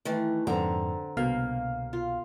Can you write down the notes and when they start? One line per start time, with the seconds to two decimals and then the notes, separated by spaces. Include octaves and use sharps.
0.05 D#3 E3 A3
0.47 F2 G#2 D3 C4 A#5
1.17 C2 B2 A#3 F5
1.93 F4